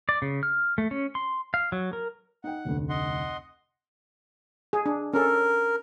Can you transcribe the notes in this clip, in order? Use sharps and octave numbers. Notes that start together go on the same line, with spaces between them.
D5
C#3
F6
A3
C#4
C6
F5
F#3
A#4
D#4 F#5 G5
F1 D2
D#5 F#5 C6
G#4
D4
C#4 A4 A#4